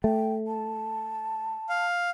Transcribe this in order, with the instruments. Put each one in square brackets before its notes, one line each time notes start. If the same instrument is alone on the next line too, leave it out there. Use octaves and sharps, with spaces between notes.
[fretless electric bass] A3 [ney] G5
[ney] A5
[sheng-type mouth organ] F5